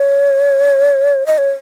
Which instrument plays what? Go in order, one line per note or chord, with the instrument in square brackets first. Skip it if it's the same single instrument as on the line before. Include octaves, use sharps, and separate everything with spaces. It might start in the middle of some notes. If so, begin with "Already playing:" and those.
Already playing: [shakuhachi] C#5
D#5
C#5